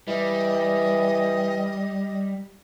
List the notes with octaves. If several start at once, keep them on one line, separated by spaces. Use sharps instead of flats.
E3 G3 D#5